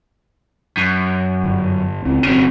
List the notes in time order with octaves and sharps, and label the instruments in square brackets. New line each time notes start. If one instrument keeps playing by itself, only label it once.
[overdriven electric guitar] F#2
[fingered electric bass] G1
C#2 C4
[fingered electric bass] E1 C4 [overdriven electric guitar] C#3 F#3